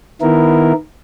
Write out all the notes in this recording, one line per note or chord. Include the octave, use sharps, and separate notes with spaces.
D#3 B3 E4 A#4